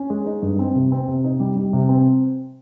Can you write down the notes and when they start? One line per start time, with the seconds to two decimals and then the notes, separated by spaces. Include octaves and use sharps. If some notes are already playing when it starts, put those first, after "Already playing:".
Already playing: C#4
0.10 G#3
0.26 D#4
0.42 G2
0.59 C4
0.75 C3
0.92 C4
1.08 C3
1.24 D#4
1.40 G3
1.56 G3
1.73 C3
1.89 C4